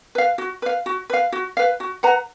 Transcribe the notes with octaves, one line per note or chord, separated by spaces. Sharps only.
B4 F5
F#4
B4 F5
F#4
B4 F5
F#4
B4 F5
F#4
B4 F#5 A#5